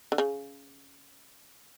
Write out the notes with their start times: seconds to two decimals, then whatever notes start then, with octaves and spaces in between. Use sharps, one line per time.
0.12 D3
0.18 C#3